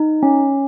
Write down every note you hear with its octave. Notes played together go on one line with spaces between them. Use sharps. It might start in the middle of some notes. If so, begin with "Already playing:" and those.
Already playing: D#4
C#4